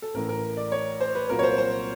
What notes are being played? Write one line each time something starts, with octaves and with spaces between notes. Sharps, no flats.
A4
A1 A2 E3 A#4
A#4
D5
C#5
C5
B4
C2 A#2 F#3 A#4
C#5
C5
C5